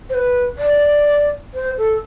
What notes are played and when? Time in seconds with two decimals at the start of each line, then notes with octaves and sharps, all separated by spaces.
0.10 C5
0.14 B4
0.58 D5
1.54 C5
1.78 A4